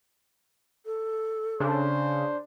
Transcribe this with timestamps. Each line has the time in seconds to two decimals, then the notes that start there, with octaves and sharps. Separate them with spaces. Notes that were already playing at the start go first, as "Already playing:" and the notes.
0.85 A4
1.60 C#3 D4 C5